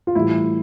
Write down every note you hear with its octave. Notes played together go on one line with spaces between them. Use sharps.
F4
A2 E3 G3 E4